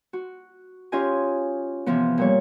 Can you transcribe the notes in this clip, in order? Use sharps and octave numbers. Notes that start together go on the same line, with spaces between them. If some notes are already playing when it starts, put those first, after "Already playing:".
F#4
C#4 F4 G4 D#5 G#5
C3 E3 F3 B3
A#2 G3 C#5